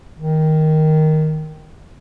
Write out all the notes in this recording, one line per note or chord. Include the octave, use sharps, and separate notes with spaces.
D#3